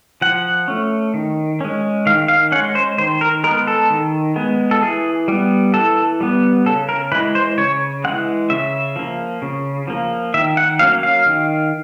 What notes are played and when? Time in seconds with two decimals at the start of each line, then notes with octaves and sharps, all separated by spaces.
0.21 F3 F#5
0.68 A3 C#4
1.14 D#3
1.61 G#3 C#4
2.06 D#3 F5
2.28 F5
2.52 C#4 F#5
2.56 G#3
2.75 C5
2.98 D#3 C5
3.21 A#4
3.44 G#3 A#4
3.47 B3
3.67 A4
3.90 D#3
4.36 G#3 B3
4.71 A4
4.82 E3 G#4
5.28 G3 B3
5.74 E3 A4
6.21 G3 B3
6.66 C#3 A4
6.89 A#4
7.12 E3 G#3 B4
7.35 C5
7.58 C#3 C#5
8.04 E3 G#3 F#5
8.50 C#3 E5
8.96 F3 A#3
9.42 C#3
9.88 F3 A#3
10.34 D#3 E5
10.57 F#5
10.79 F#3 A#3 C#4 F5
11.03 F5
11.26 D#3